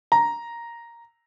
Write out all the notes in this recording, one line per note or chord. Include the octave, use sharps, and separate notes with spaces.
A#5